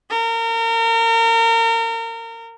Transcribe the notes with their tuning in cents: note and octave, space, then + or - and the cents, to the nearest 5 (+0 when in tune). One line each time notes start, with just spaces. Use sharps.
A#4 -30